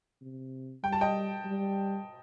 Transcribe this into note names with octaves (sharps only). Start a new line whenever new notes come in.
C3
G3 G5
A5
D#5 G5
G3